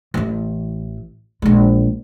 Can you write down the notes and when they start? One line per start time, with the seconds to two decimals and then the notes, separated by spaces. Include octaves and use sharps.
0.14 A1 E3
1.42 A#1 G#3